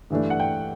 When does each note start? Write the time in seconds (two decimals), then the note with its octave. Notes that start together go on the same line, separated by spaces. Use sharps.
0.10 G2 E3 A3 D4
0.30 F#5
0.40 G5